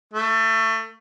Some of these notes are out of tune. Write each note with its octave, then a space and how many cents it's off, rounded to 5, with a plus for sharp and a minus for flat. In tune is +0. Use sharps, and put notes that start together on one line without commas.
A3 +25